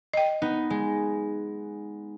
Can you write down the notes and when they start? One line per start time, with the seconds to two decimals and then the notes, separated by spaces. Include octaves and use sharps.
0.14 D#5 G5
0.42 B3 D#4
0.70 G#3